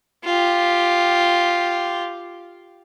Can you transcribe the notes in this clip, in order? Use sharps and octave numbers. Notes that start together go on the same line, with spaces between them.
F4 G4